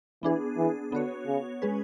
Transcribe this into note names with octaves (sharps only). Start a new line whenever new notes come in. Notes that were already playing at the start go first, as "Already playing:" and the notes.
E3 B3 D4 G#4
E3
D3 B3 F#4 C#5
C#3
G#3 C#4 G#4 B4